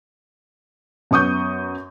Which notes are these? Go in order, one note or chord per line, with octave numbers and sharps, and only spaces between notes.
F#2 B3 C#6 D#6 G6